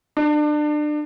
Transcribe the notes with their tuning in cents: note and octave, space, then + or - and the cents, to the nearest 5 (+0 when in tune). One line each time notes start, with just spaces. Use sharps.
D4 +30